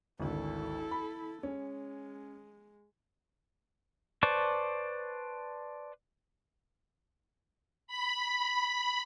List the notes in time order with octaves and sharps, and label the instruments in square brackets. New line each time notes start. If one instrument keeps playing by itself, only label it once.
[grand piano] G#1 D2 [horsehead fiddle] E4 A4
[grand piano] B5
[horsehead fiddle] G#3 [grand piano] C#4
[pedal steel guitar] B4 C5 D5 A5 C#6
[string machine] B5